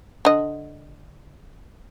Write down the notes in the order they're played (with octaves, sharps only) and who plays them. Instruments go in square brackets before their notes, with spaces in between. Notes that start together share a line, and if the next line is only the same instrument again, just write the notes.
[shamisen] D3 D#5